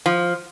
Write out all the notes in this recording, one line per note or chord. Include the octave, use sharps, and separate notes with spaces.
F3